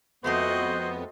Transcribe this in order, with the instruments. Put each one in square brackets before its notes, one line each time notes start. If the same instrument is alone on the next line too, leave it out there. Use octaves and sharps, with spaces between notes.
[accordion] F2 B3 [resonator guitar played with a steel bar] G#3 A3 C4 [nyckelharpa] F#4 D#5 [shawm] C5